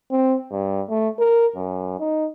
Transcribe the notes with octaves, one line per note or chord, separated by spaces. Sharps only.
C4
G2
A3
A#4
F#2
D#4